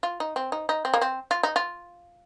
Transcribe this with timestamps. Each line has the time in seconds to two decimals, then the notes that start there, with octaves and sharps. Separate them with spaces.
0.03 F4
0.20 D#4
0.36 C4
0.52 D#4
0.69 D#4
0.85 C4
0.94 A#3
1.01 C4
1.31 F4
1.43 D#4
1.56 F4